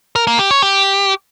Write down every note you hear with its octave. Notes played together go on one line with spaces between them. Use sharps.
A#4
A#3
G4
C#5
G4